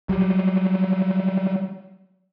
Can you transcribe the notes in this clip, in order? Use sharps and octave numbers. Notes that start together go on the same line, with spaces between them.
F#3 G3